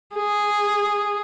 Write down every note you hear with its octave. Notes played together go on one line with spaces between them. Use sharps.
G#4